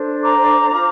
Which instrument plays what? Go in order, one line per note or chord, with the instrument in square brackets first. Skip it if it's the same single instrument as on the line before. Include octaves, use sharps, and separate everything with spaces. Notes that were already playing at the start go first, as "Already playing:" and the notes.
Already playing: [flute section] D4 A4 C5
A#5 D6
F4 C5